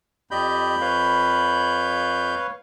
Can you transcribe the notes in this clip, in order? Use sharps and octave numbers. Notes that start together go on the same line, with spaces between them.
F2 G4 D5 D#5 B5 G6
B4 C#5 F5